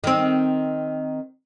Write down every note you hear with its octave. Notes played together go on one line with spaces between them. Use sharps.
D#3 C4